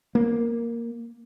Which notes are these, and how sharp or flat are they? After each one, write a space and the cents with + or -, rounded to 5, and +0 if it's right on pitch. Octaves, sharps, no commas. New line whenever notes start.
A#3 +0